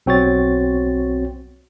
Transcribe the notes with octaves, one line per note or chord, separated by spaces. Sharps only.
B1 C4 F#4 C#5 A6